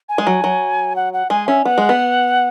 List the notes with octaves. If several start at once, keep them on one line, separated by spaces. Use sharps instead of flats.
G#5
G#3
F#3
F#3
F#5
F#5
G#3 G#5
C#4 E5
B3 F#5
G#3
B3